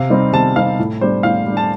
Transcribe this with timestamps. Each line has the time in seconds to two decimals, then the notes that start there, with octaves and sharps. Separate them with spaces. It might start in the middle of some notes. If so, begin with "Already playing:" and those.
Already playing: C3 F5
0.10 G3 C4 D#4
0.33 C3 A5
0.56 G3 C4 D#4 F5
0.79 A2
1.01 G3 D4 C5
1.23 A2 F5
1.46 G3 D4
1.57 A5